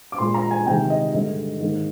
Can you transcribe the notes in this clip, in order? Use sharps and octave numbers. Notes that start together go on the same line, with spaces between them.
D6
A#2 G#3 C6
A#5
G#5
C3 D#3 G#3 G5
D#5
G2 D3 G#3 D#5
G#2 D#3 A#3